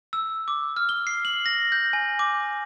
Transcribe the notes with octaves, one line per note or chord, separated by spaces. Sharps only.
E6
D6
F6
G7
C7
F#7
A#6
G6
G#5
D6